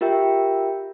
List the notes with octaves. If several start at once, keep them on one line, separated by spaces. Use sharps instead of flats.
F4 G4 A#4 E5 G5